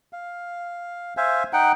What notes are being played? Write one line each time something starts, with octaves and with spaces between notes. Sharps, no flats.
F5
C5 E5 F5 G#5
D#4 F#5 G5